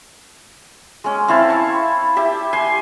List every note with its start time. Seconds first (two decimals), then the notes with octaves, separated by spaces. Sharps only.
1.04 G#3 C#4
1.28 C4 E4 F5 A5
1.50 C#6
2.16 G4 E5
2.53 G#5 C6